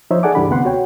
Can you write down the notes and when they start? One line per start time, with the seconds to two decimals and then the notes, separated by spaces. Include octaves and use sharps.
0.11 F3 D#4 C5 C#5 E5
0.23 G#4 A4 D5 F#5 G#5 D6
0.35 C#2 G2 E3 D4 G4 B5
0.49 D2 C3 B3 F#5 C6
0.65 F#4 C#5 G5